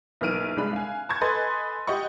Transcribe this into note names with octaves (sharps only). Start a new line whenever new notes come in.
B1 E3 A#3 F6 D7 D#7
C2 G#3 D4 B5 F#6
F5 G#5
A5 C#6 G#6
A4 B4 D#5 G#5 C6 A6
G4 D#5 F#5 C#6